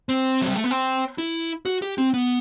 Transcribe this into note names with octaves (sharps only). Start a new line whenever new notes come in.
C4
F#3
G3
A3
B3
C4
E4
F#4
G4
C4
B3